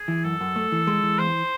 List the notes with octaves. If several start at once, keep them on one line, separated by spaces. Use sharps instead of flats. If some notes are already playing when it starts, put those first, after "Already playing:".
Already playing: G#4
E3
F#2 A4
F#2
A3
E3
G#3
E3
E2 C5